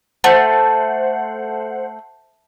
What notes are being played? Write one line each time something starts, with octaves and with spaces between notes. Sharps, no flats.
A3 C5 F#5